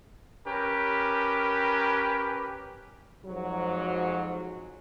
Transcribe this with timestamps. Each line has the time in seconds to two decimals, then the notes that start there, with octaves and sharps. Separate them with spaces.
0.47 C#4 G4 A#4 B4
3.25 F2 G#2 F#3